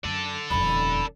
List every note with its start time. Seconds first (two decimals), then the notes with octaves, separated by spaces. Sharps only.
0.04 F#2 A4 D5
0.50 D#1 F2 B5